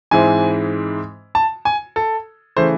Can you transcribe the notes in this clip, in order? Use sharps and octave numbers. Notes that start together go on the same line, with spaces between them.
G#2 E3 G#3 C4 E4 G#5
A5
G#5
A4
C#3 E3 A3 C5